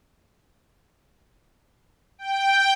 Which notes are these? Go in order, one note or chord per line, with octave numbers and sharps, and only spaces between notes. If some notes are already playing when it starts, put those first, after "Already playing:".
G5